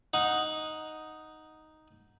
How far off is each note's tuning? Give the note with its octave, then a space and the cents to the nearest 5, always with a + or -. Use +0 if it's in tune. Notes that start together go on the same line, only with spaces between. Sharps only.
D#4 +0 F#5 -10